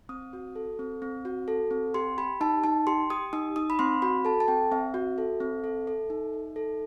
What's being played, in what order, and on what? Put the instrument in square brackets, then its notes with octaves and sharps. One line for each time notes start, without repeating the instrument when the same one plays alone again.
[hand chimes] C4 D#6
F#4
A4
C4
C4
F#4
A4
C4
G4 C6
G4 B5
D#4 A5
D#4 A5
G4 C6
G4 D#6
D#4 D#6
D#4 D#6
B5
C4 C6
F#4 B5
A4 A5
A5
C4 G5
C4 E5
F#4
A4
C4
A4
A4
D#4
D#4
A4